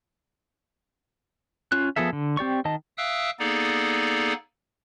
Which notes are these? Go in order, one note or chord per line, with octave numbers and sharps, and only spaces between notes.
C#4 F4 F#6
F3 B3 G#4 A4 E5
D3
C4 G4 D5 C#6
D#3 D#5 A5
E5 F5 G5 D#6 E6 F#6
A#3 B3 D#4 G#4 A4 D5